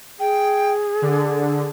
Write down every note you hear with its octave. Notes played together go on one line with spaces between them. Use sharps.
G#4 G5
D3 D5